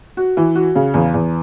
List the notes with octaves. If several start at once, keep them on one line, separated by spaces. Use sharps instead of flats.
F#4
E3
F#4
C#3
E2
E2